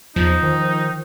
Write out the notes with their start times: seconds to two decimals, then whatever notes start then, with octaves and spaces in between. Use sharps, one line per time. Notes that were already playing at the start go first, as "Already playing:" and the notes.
0.16 E2 F3 D#4
0.43 D#3